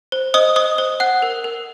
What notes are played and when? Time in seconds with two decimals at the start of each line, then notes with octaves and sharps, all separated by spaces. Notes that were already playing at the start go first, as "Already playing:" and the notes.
0.12 C5
0.34 C5 D#5 D#6
0.56 C5 D#5 D#6
0.78 C5
1.00 F#5 F#6
1.22 A#4
1.44 A#4